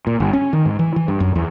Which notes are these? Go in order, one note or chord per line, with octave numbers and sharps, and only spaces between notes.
A#2
G1
C#4
D#3
G#2
E3
E3
G2
F#2
E2